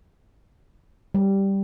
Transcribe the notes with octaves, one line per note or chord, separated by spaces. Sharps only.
G3